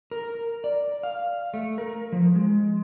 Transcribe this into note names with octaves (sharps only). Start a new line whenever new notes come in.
A#4
D5
F5
A3
A#4
F3
G#3